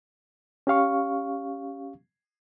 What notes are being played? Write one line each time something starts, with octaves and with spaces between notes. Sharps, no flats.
C#4 G4 F5 C#6